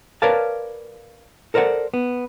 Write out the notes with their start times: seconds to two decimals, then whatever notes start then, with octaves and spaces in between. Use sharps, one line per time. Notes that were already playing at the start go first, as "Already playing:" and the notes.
0.22 A#4 B4 C#5 D5 F5 A5
1.54 A4 A#4 C5 D5 F#5
1.94 B3